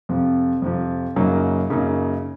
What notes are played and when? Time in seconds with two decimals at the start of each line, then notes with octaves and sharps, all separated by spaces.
0.09 F2 C3 F3
0.62 F2 C3 F3
1.16 F#2 C#3 F#3 A#3 D#4
1.70 F#2 C#3 F#3 A#3 D#4